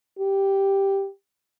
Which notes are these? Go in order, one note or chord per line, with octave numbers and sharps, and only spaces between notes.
G4